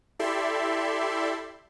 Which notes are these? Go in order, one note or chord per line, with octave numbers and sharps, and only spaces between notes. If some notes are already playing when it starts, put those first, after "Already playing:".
E4 G4 A4 D5 E5 C6